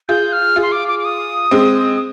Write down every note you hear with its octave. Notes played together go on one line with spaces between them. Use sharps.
F4 G#4 G6
F6
F4 G#4
C6
D6
D6
D6
D#6
G#3 C4